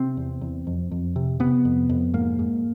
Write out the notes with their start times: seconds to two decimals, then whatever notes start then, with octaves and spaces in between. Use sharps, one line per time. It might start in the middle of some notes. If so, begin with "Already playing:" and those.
Already playing: C3 C4
0.17 E2
0.41 E2
0.67 F2
0.91 F2
1.16 C3
1.40 C3 B3
1.65 F2
1.89 F2
2.14 G#2 A#3
2.39 G#2